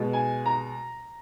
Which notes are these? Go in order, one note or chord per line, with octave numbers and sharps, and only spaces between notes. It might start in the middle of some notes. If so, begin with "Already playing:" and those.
Already playing: B2 G#3
G#5
A#5